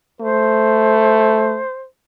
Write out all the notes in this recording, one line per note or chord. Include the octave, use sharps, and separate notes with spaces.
A3 C5